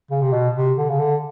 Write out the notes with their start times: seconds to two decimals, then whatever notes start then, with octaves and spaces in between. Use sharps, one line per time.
0.10 C#3
0.21 C3
0.33 B2
0.55 C3
0.78 D3
0.89 C#3
0.99 D3